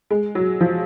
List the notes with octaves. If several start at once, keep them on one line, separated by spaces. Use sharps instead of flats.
G#3
F#3
F3